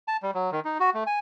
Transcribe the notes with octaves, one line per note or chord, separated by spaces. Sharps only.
A5
G3
F#3
D#3
D#4
F#4
A3
G#5